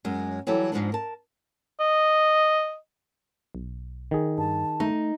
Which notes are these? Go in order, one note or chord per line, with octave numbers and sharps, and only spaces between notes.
F#2 G#3
E3 F#3 G3 G4 A4
G#2 C3 F3 G#3 B3 D4
A#4 A5
D#5
B1
D#3 G#4
G2 A5
A3 D#4